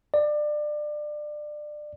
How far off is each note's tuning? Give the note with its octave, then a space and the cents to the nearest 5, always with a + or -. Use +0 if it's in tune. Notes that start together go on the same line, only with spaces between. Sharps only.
D5 +25